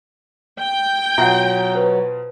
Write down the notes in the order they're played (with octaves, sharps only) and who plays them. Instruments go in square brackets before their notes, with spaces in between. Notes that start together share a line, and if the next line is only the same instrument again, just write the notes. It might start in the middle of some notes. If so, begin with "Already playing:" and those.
[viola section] G5
[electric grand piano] B2 F4 A#5 [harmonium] F#3 [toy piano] E5 F#5
[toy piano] B4 C5